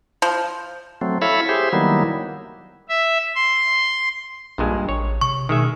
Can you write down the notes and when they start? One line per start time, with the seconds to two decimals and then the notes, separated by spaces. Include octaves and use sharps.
0.22 F3
1.01 F#3 A3 C4
1.22 E4 A4 C#5 E5 F5 B5
1.49 G4 G#4 C5 E5
1.73 D#3 F#3 G3 A#3 B3 E4
2.89 E5
3.35 C6
4.58 B1 G2 A#2 G#3
4.89 A1 C#5
5.21 C3 C#6
5.49 B2 D#3 G#3 E5